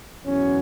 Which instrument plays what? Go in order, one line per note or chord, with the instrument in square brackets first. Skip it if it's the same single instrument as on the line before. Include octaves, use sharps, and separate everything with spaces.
[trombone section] E2 B2 F#3 C#4